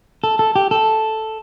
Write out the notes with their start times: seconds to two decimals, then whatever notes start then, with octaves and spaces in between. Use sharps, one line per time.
0.24 A4
0.39 A4
0.56 G4
0.71 A4